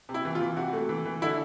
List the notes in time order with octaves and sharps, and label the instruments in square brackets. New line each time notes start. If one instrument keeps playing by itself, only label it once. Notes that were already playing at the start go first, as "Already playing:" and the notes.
[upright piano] C3
E4
E3
F4
E3
C3 F#4
A3
E3
E3
D3 E4